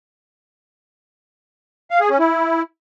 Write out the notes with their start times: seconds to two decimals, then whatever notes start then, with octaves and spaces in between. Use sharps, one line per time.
1.91 F5
2.00 G#4
2.10 C#4
2.19 E4